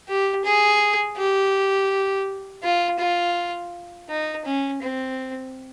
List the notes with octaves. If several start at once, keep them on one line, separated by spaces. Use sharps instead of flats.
G4
G#4
G4
F4
F4
D#4
C#4
C4